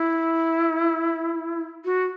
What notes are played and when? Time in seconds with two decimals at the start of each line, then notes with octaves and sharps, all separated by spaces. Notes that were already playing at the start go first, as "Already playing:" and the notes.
Already playing: E4
1.85 F#4